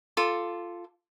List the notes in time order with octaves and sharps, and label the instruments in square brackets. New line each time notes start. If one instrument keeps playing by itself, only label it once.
[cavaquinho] F4 A4 D6